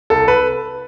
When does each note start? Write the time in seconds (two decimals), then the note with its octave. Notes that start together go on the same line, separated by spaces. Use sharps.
0.10 C2 A4
0.28 B4